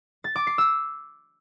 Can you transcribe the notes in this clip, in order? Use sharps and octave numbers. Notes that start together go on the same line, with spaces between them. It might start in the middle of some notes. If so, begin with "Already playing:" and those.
A6
D6
C7
E6